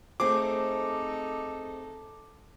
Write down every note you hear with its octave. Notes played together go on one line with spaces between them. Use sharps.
A3 C4 D#4 G#4 A4 D6